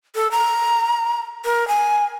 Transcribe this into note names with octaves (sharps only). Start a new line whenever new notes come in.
A4
A#5
A#4
G#5